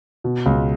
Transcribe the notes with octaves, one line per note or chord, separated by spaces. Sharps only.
B2
C#2